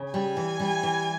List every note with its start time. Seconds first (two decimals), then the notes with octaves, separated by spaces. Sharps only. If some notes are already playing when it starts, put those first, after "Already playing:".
Already playing: C#3
0.13 G3 G#5
0.37 E3
0.60 G3
0.83 E3